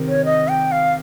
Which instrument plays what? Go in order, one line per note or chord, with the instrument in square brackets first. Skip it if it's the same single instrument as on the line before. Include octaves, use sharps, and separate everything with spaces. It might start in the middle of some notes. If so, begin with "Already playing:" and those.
Already playing: [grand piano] C3 D#3
[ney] C#5
D#5
G5
F5